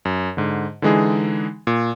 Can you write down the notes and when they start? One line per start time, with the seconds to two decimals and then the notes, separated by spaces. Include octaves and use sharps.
0.05 F#2
0.37 G#2 D3
0.82 D3 E3 G#3 D#4 G#4
1.67 A#2